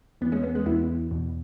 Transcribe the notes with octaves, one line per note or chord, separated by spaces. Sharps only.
E2 E3 B3
G#3 C#4
B3
G#3
E2 E3 B3 E4
E2 B2